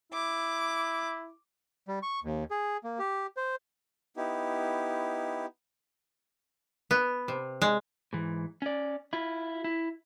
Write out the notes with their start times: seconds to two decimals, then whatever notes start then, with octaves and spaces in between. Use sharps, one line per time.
0.13 E4 D6
1.88 G3
2.03 C#6
2.23 D#2
2.51 G#4
2.84 A#3
2.99 G4
3.37 C5
4.17 B3 D#4 E4 G4
6.91 B3
7.28 C3
7.62 G#3
8.13 G#2 E3
8.62 C#4 D5
9.13 E4 F4
9.64 E4